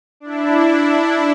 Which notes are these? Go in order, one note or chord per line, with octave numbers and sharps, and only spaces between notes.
D4 E4